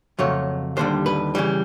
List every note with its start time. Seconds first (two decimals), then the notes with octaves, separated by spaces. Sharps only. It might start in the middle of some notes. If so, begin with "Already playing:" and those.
0.19 F2 C#3 F#3 A3 C#5
0.77 D#2 D3 G3 C5
1.06 B4
1.35 C#3 E3 G3